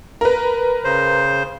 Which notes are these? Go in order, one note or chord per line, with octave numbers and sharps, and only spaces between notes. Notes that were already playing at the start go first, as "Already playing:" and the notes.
A#4 B4
C#3 C5